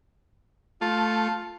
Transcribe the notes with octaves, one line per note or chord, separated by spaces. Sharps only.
A3 F4